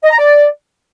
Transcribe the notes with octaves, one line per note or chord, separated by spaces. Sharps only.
D#5
A#5
D5